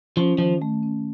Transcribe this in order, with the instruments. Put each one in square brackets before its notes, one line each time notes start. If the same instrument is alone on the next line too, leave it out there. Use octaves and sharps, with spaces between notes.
[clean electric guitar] F3 [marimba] C#4
[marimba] D#3 [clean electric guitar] F3
[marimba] A3
C#4